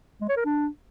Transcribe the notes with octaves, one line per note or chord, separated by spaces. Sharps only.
G#3
C#5
A#4
D4